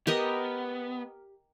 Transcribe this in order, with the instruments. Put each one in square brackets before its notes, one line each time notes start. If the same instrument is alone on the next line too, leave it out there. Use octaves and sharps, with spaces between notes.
[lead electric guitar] B3 [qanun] G4 A#4 D#5